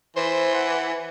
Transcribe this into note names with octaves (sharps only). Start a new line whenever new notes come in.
E3 C5
F#5